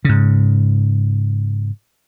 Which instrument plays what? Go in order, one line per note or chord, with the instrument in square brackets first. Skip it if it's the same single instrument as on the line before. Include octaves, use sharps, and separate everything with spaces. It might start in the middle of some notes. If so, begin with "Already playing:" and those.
[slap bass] G#2 C#3